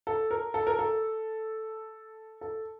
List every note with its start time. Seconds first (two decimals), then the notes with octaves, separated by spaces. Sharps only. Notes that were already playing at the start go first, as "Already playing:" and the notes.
0.07 A4
0.31 A#4
0.54 A4
0.67 A#4
0.79 A4
2.41 A4